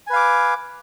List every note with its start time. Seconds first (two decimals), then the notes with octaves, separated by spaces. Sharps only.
0.07 G#5
0.10 B4
0.13 F5
0.16 D6